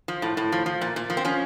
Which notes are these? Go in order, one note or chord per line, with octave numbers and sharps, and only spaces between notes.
F3
A2
A2
F3
F3
A#2
A#2
F3
C4
F3 C#4